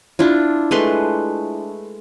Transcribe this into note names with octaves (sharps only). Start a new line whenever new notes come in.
D4 E4 F4
G#3 A3 B4 C6